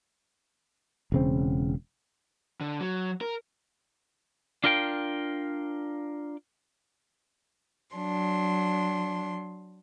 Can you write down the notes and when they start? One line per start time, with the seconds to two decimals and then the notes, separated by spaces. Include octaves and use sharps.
1.12 E1 C#3 C4
2.61 D3
2.81 F#3
3.21 A#4
4.64 D4 F4 A#4 F5 G5
7.95 F#3 D4 C6